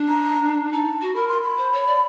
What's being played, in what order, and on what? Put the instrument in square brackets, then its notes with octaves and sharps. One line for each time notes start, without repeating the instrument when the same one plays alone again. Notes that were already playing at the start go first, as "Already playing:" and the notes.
Already playing: [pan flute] D4
[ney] A#5
[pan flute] D#4 [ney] A5
[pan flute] F#4
[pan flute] A#4 [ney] B5
[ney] C6
B5
[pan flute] C5
C#5
D5